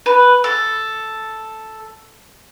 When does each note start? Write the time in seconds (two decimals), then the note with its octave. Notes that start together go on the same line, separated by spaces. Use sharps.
0.06 B4
0.44 A4